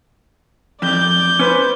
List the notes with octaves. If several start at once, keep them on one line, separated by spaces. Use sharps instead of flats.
F2 D5 G6
C#4 B4 C5